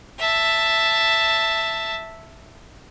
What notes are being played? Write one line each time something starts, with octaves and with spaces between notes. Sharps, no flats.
E5 A5